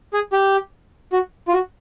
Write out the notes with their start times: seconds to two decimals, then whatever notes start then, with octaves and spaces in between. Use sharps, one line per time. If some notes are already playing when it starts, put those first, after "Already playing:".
0.13 G#4
0.33 G4
1.13 F#4
1.48 F4
1.53 F#4